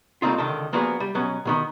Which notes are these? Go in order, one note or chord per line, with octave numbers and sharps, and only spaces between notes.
G3 A3 A#3 C4 D#4 F4
C#2 D3 D#3 A5
F3 A#3 B3 D4 F#4 G#4
G3
B2 F#3 B3 C#4
B2 D#3 B3